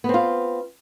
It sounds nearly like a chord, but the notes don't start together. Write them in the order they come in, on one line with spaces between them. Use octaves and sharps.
B3 C4 F4